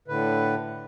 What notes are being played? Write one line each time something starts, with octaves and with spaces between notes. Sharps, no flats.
A2 D3 B4